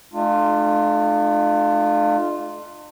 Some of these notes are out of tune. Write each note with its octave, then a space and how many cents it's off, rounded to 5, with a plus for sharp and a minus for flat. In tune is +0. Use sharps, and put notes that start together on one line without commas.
A3 -40 D4 +40 F4 +0